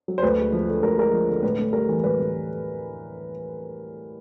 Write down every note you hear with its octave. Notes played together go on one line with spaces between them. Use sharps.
F#3
C5
D2 B4
G#3
F3
D3
D2 A#4
G#3 A#4
F3
D3
A2 B4
A2
G3 A#4
E3
A2 B4
A2